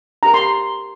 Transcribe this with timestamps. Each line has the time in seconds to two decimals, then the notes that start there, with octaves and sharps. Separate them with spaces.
0.23 D4 G4 A#4 A#5
0.34 C6